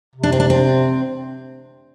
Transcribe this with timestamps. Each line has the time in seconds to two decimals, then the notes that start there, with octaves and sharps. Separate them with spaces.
0.16 C3
0.23 D4
0.32 C4
0.40 D4
0.50 C4